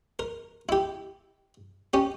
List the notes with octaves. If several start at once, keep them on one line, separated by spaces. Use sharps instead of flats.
A#4
E4 G4
C#4 G4